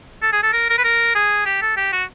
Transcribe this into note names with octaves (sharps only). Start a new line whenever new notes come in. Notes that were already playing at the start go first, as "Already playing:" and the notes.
A4
G#4
A4
A#4
A#4
B4
A#4
G#4
G4
A4
G4
F#4